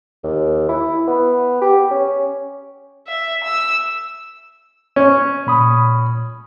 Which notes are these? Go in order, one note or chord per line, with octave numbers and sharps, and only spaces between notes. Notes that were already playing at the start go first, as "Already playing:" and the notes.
D#2
E4
B3
G4
C#4
E5
E6
C#4
A#2 B5 D#6